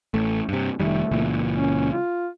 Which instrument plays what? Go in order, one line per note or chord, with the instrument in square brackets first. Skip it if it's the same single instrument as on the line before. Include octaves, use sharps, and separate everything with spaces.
[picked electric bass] A1 A3
G2 C3
[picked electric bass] F1 D#3 G3 [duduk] A3
[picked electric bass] C#2 A#2 E3
[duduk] C#4
F4